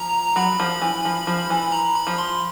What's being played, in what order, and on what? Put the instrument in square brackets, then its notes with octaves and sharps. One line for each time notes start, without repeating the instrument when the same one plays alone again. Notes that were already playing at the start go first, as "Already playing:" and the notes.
Already playing: [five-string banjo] F3 [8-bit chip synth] A#5
[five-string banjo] F#3 [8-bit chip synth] B5
[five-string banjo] F3
E3
F3
F3
E3
[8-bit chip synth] A#5
B5
[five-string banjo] F3
[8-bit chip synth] C6